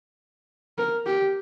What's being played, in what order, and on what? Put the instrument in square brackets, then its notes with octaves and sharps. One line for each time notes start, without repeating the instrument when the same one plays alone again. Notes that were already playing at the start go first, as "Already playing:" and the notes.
[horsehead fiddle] A#4
G4